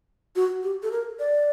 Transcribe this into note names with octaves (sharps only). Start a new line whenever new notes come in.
F#4
G4
A4
A#4
D5